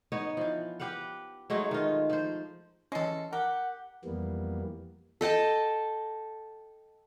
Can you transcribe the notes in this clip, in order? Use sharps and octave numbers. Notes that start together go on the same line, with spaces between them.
B3 D#4 C#5 D#5
E3 F3
G4 B4 F5 F#5
F#3 G#3 A3 D#4
D#3 F4
F3 C5
E3 G#3 C#4 A4
G4 A#4 F#5
F2 E3 G3 A#3 B3
A4 D#5 G5 A5